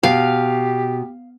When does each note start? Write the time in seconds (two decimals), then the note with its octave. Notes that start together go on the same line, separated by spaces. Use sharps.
0.03 B2 G4 F5